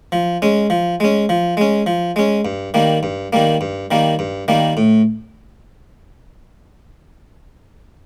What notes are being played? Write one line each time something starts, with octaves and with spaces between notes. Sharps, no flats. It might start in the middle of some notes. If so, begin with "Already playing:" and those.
F3
G#3 C#4
F3
G#3 C#4
F3
G#3 C#4
F3
G#3 C#4
G2
D#3 G3 A#3
G2
D#3 G3 A#3
G2
D#3 G3 A#3
G2
D#3 G3 A#3
A2